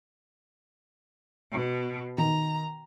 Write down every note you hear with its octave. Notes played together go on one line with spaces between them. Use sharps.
B2
D#3 A#5